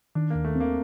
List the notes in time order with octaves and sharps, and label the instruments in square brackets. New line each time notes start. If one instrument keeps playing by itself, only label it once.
[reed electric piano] D#3 [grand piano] D4
[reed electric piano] D#2 [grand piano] A#3
[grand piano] A3
[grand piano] A#3 [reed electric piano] C4